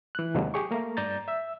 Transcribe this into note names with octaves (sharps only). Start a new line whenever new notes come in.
E3 F#6
D#2 C3 D#3 F#3 G#3 A#3
G4 G#4 C#6
A3 A#3 A#5
G2 D5 A#5 G6 A6
E5 E6